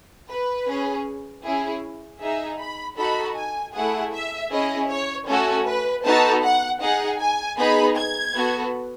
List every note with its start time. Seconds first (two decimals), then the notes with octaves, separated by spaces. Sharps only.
0.29 B4
0.67 C#4 G#4
1.44 C#4 E4 G#4
2.20 D#4 G#4 E5
2.59 B5
2.97 D#4 F#4 A4 B5
3.36 G#5
3.74 A3 E4 G#4 F#5
4.12 E5
4.50 C#4 E4 G#4 D#5
4.89 C#5
5.27 A3 C#4 F#4 A4
5.66 B4
6.04 B3 D#4 F#4 A4 A5
6.42 F#5
6.81 D#4 G#4 F#5
7.19 G#5
7.58 B3 D#4 G#4 B5
7.96 G#6
8.34 B3 F#4 A4